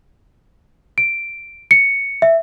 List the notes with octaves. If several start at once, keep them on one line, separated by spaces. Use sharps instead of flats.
D7
C#7
E5